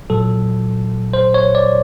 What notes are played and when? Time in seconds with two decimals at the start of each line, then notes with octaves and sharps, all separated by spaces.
0.10 A#2 F#3 A4
1.14 C5
1.34 C#5
1.55 D5